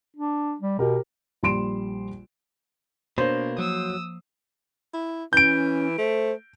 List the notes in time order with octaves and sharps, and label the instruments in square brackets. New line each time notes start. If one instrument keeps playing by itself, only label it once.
[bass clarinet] D4
G3
[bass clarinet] B2 [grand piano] G4 A#4
[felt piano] A#1 G3 C6 D7 E7
[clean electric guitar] B2 A#3 [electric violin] D4 [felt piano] C5 [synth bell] C#5
[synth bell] F3 A#3 [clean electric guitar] F#3 [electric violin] D#6 E6
[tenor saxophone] E4
[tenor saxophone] E3 [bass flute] C#4 [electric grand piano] G6 D7
[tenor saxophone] A3 [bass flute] C5